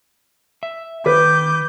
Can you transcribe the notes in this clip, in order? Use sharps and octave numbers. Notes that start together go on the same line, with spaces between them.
E5
D#3 B4 D6 G6